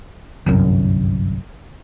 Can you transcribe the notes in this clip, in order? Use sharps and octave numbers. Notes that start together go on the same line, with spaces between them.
G1 C2 F#2